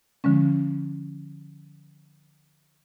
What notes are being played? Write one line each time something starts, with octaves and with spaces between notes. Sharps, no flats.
D3 F3 G#3 C#4